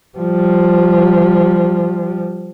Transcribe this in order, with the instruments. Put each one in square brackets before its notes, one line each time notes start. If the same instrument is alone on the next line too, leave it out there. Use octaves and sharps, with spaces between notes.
[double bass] F3 G3